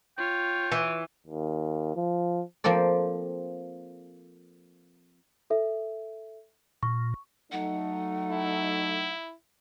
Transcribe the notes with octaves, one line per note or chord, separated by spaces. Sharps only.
F4 C#5 G5
E3
D#2
F3
F3 A#3 C4 A4 D5
A4 E5
A#2 C#6
F#3 A3 D#4 F#5
E4